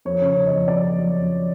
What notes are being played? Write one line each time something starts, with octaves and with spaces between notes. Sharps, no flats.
F2 C#5
C#3 C#5
F2
D#5
F2
F2 D5
F2
F#3
F2